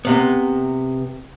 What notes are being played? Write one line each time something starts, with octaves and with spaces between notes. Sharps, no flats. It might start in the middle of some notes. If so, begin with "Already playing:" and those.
C3 B3